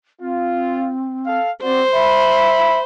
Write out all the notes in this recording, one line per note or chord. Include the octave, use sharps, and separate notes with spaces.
C4 F4
A4 F5
C4 F#4 C5 D5
E5 B5